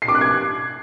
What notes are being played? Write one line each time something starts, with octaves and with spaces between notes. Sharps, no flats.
C7
D6
F#6
G#6